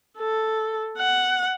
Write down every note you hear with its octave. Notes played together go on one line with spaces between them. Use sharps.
A4
F#5